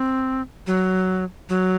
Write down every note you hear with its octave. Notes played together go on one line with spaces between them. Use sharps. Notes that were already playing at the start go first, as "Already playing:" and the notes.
Already playing: C4
F#3
F#3